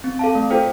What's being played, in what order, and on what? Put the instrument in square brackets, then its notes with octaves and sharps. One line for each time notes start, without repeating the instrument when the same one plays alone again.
[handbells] C4
A4 F5 A5
A3
F4 A4 C5 G5